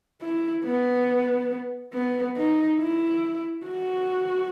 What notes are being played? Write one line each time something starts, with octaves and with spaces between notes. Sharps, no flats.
E4
B3
B3
D#4
E4
F#4